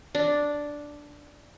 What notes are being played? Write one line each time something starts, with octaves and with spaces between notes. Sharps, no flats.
D4